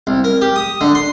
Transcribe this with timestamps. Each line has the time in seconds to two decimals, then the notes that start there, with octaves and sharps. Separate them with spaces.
0.07 C2
0.24 A#4
0.41 G4
0.56 D#6
0.81 D3
0.95 C6